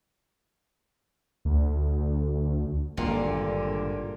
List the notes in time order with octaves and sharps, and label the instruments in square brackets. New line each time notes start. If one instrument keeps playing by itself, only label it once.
[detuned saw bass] D2
[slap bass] G#1 [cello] G2 D3 [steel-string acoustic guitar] A#2